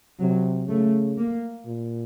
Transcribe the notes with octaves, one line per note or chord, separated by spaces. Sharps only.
C3 F#3
C#3 A3
A#3
A#2